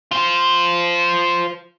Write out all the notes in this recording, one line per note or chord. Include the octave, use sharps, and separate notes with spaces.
F4 C5